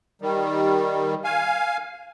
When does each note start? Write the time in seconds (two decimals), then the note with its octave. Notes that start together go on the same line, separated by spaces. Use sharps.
0.22 D#3 G3
1.24 F5 G#5